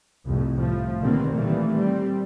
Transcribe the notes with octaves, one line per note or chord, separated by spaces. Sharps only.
C2 F2 A2
A2 F3
B2 D3 D#3 G3 A#3 C4
A#2 D#3 E3 G3 A3 A#3
G3 C4